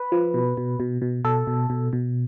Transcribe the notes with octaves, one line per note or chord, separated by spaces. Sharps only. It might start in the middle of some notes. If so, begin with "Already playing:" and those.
Already playing: B4
F3
B2
B2
B2
B2
B2 A4
B2
B2
B2